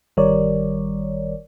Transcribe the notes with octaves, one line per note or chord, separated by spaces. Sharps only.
G1 D#3 G3 A#4 C#5 D5